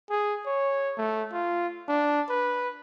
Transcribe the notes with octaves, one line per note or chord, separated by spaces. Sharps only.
G#4
C#5
A3
F4
D4
B4